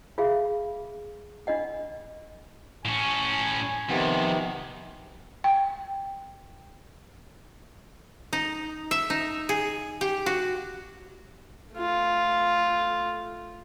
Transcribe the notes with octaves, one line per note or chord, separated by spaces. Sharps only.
F4 G#4 E5 F5
D4 F4 D#5 F#5
A2 C#4 G#5
F2 C3 D#3 B3
G5
D#4
E5
D#4
G#4
G4
F#4
A3 F4